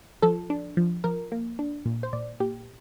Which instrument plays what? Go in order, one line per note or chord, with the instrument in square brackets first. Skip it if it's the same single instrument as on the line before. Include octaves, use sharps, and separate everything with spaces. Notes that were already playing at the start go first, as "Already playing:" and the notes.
[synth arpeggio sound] F3 A4
D4
F3
F3 A#4
A#3
D4
A#2
C5
A#2 D5
A#2 G4